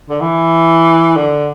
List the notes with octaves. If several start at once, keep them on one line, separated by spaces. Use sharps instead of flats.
D3
E3
D3